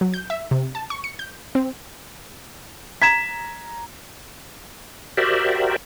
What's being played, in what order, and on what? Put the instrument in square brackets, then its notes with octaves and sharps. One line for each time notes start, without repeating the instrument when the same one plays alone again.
[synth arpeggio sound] F#3
G6
E5
C3
A5
C#6
C#7
G6
C4
[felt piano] A#5 G#6 [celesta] B6 E7
[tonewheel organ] F#4 G4 A#4 C5 D5 E5